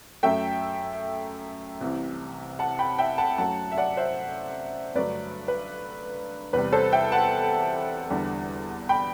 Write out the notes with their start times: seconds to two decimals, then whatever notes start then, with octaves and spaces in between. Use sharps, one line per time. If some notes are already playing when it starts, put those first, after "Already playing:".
0.23 F#2 F#3 A3 E5 G5
1.81 C2 C3 E3
2.59 F#5 A5
2.79 G5 B5
2.99 E5 G5
3.18 F#5 A5
3.38 F#2 F#3 A3 F#5 A5
3.72 E5
3.77 D5 F#5
3.97 C5 E5
4.95 G2 D3 F#3 A3 B4 D5
5.48 B4
6.53 E2 C3 G3 B4
6.72 A4 C5
6.92 E5 G5
7.12 F#5 A5
8.10 E2 D3 G3
8.89 G5 B5